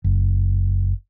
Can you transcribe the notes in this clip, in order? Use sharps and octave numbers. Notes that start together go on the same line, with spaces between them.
F#1